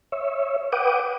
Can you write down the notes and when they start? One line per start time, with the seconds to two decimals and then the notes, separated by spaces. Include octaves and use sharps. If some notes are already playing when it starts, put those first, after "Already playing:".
0.12 C#5 E5
0.72 B4 F#5 G5 D6 D#6